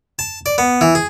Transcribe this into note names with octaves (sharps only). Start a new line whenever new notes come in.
A5
D5
B3
E3
G#4